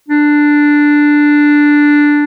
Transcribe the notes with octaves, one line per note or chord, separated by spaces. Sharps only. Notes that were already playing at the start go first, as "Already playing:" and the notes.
D4